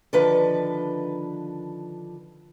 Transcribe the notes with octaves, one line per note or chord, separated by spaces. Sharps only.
D3 D#3 F3 B4